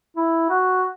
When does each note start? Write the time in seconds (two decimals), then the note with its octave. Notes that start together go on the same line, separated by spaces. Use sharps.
0.17 E4
0.50 F#4